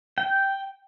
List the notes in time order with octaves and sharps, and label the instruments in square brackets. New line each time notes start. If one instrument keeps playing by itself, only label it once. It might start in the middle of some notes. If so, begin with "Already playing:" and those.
[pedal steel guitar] G5